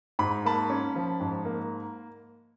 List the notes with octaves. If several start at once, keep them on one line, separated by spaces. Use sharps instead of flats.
G#2 B5
A#3 A5 B5
C#4
F3
G#2
A#3